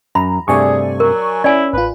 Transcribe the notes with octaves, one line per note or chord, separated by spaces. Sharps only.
F#2 A#5 B5
G2 C3 A3 G#4 D5 G#5 C#6
F#3 A#4
C#4 E4 D5 G#5
A1 F4 B4